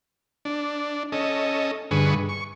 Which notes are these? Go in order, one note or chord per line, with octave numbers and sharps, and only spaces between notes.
D4
C#4 A4 D#5
G2 D3 G#4 B4 C#6
C#6